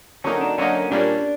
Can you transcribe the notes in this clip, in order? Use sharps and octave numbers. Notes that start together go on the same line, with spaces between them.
D3 F#3 A#3 C#4 D#4
D4
D3 F#3 A#3 C#4 D#4
A#2 G3 A#3 C#4 D4